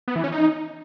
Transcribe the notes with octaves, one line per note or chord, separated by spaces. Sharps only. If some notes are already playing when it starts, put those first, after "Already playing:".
B3
E3
C#4
D#4